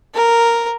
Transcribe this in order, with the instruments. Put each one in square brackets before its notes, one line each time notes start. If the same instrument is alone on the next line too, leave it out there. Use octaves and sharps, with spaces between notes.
[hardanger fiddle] A#4